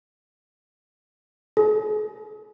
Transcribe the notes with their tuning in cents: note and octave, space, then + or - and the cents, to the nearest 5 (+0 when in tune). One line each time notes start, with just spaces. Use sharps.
G#4 +40